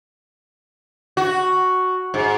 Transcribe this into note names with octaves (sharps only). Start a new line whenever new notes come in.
F#4
G#2